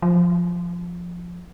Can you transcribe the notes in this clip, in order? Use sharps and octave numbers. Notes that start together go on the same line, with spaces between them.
F3